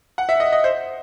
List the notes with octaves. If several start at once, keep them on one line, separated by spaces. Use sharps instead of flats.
F#5
E5
D#5
D#5
C5